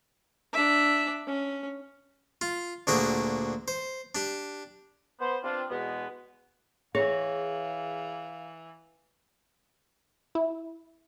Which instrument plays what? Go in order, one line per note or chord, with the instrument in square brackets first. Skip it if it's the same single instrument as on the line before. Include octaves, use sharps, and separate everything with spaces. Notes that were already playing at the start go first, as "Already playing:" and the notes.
[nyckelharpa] D4 E5
C#4
[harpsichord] F4
D2 A#2 D4 F#4 G#4 G5
C5
D4 G4
[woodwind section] B3 C5
C4 D4 F4
E2 B2 G#3 B3
[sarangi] E3 [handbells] G#4 [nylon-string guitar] C#5 [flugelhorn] F5
[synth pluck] E4